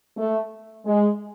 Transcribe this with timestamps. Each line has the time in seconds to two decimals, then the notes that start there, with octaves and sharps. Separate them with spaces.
0.17 A3
0.86 G#3